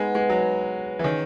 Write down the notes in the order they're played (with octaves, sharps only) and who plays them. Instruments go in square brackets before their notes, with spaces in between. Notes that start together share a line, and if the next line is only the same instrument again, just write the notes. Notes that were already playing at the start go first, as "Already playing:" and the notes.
Already playing: [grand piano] G#3 [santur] B3 D#4 G#4 B4
[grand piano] G#3
F#3
E3
[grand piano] D#3 [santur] C#4 G#4 C#5